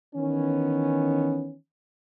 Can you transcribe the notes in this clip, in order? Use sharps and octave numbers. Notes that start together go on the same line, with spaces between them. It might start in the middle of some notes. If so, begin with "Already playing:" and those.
D#3 E3 B3 C#4